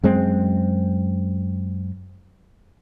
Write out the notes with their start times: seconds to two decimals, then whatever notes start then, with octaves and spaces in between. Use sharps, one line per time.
0.04 F#2 G#3 C4